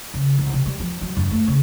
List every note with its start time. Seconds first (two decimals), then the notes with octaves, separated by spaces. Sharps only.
0.14 C#3
0.38 C2
0.53 C3
0.66 G3
0.80 F3
1.01 F#3
1.17 F#2
1.31 A3
1.48 C#3